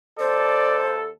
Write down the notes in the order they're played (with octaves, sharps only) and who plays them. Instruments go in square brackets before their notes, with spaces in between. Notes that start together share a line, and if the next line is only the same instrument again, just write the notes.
[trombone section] D#2 A4 [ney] C5 [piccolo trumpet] D5